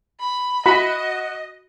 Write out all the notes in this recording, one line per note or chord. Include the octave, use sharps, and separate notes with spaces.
B5
F#4 D#5 B5